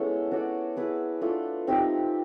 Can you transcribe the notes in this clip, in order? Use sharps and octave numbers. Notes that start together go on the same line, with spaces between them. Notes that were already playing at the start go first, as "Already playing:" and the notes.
Already playing: G#3 B3 C#4 E4 A4
C#4 F#4 A4 D5
B3 E4 G#4 B4
A3 D4 F4 A4
A3 C4 D#4 G4